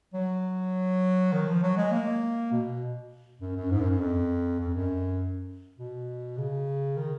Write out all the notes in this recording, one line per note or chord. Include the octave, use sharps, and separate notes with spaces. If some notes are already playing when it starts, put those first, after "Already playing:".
F#3
D#3
F3
F#3
G#3
A#3
B2
F#2
F#2
G#2
F#2
F#2
F2
F2
F#2
B2
C#3
D#3